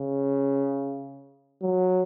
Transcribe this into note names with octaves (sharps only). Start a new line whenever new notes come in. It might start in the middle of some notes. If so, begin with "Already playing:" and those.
Already playing: C#3
F#3